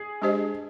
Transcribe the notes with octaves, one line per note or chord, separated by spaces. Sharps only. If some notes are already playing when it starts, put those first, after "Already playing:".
Already playing: G#4
G#3 D4 G4 C5 D#5